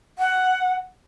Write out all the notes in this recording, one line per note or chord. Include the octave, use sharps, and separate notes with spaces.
F#5